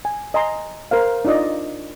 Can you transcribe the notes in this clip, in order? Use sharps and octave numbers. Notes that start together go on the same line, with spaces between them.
G#5
D#5 G#5 A#5 C6
A#4 C5 F5
D4 D#4 F4 D5 D#5